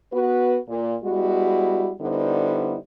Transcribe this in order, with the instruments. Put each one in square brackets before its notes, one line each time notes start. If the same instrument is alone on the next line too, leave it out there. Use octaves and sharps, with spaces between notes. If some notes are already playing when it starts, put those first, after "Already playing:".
[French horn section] B3 F#4 B4
A#2
G3 G#3 B3 E4 F#4
D3 G3 B3 D#4 E4 C5